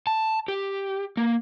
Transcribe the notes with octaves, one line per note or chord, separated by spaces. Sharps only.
A5
G4
A#3